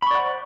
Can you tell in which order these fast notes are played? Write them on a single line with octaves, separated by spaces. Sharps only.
B5 C#6 D5 F#5 C5